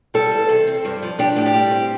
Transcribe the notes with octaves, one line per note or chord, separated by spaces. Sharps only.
G3 A4
E2
C3
C4
G2
F3
D4 G4
A2
G4
G3
C4